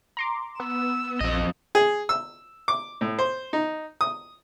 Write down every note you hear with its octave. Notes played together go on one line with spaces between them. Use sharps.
A#5 C6 D6
B3 E6
A#1 F2 D#5
G#4
E6
D6
A2
C5
D#4
D#6